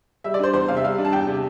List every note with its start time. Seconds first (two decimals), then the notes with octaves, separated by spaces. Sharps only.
0.24 G3 E5
0.34 D5
0.39 D4 C5
0.53 E2 C5
0.68 C3 F5
0.77 E5
0.84 G3 F5
0.98 D4
1.05 A5
1.13 E2 G5
1.27 C3